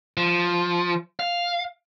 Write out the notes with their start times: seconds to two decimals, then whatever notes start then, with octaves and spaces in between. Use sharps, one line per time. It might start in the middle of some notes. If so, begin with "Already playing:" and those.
0.17 F3
1.20 F5